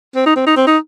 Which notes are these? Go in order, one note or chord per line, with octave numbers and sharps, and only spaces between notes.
C4
D#4
C4
D#4
C4
D#4